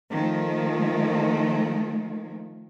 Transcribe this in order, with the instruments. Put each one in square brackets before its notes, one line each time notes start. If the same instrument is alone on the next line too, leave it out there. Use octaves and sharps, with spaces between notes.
[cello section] D#3 F3 A3